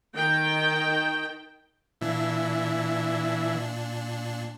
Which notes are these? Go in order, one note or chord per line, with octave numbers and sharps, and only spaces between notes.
D#3 G5
A#2 E3 D4